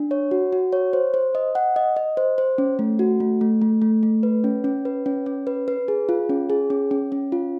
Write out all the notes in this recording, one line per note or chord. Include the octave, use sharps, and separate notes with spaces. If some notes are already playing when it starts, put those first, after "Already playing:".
Already playing: D4
C#5
F#4
F#4
C#5
C5
C5
D#5
F#5
D#5
D#5
C5
C5
C#4
A3
F#4
A3
A3
A3
A3
A3
B4
C#4
C#4
B4
C#4
C#4
B4
B4
G#4
F4
C#4
G#4
C#4
C#4
C#4
F4